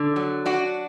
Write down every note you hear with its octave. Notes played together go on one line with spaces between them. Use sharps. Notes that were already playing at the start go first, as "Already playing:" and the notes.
Already playing: D3
F#3
D4 F#4